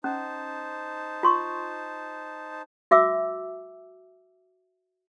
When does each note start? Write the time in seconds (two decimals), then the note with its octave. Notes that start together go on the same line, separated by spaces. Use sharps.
0.04 C#4 D#4 C5 A5
1.23 F4 C6 C#6
2.91 F#4 E5 D6 E6